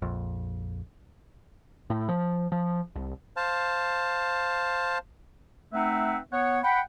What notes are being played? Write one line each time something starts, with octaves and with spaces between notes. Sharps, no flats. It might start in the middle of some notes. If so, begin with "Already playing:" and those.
A#1 F2
A2
F3
F3
C2
C5 F5 A5
A3 C4 D#4 B4 E5 F#5
B3 C#5 F#5
F#5 G5 B5